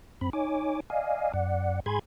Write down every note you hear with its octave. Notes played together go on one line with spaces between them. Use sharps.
F#2 C4 B5
D#4 C#5 G#5 D6
D5 D#5 F5 G#5
F#2 D5 F#5
G#2 G#4 G#5 B5 C6 G#6